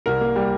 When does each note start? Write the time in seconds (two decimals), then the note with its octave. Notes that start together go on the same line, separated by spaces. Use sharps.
0.06 C2 A#4
0.21 A#3
0.36 G3